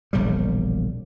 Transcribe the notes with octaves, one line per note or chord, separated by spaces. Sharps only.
E1 A#1 C#3 G3